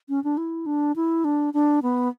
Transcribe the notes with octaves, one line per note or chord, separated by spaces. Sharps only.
C#4
D4
E4
D4
E4
D4
D4
B3